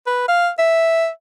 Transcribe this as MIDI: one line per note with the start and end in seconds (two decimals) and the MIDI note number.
0.07 0.26 71
0.28 0.50 77
0.59 1.08 76